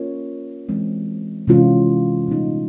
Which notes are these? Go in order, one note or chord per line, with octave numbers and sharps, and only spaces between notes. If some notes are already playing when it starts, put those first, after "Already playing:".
Already playing: A#3 C#4 F4 A#4 C#5
E3 G#3 C4
C3 E3 G#3 C#4 F4
A#2 G3 B3 D#4